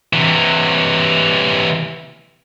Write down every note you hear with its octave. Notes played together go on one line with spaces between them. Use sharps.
C3 E3